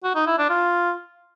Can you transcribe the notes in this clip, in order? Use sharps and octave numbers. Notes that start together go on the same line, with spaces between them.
F#4
D#4
E4
D4
F4